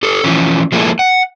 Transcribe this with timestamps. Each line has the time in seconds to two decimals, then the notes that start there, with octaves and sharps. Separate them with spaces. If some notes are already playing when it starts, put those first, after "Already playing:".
0.03 G4 A4
0.24 E3 F3 C#4
0.72 F3 G#3 A#3 C4 E4 A4
0.99 F#5